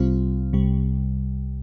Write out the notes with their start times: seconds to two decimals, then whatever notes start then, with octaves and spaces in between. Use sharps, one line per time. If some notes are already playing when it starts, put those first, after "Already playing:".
Already playing: C2 C3 G3 C4 F4
0.53 C2 C3 G3